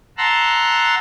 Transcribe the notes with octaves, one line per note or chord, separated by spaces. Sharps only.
F#5 A5 A#5 C6 E6 F#6